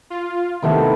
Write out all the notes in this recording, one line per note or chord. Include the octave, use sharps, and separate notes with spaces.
F4
C3 D#3 A3 B3 E4